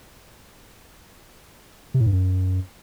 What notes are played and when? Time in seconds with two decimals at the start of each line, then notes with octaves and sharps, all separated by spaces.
1.94 C3
2.00 A2
2.06 G2
2.12 F#2